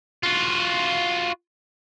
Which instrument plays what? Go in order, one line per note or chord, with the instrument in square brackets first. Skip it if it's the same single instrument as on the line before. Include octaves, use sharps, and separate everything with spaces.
[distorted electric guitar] F4 F#4